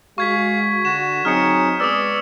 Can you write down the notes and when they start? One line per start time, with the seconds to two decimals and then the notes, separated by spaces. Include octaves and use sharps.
0.18 G#3 F#4 F5 C#6 G#6 B6
0.85 D3 F#4 E7
1.25 F#3 C4 D#4 G#4 F6 C#7
1.80 G#3 B3 B4 D5 D#6 E6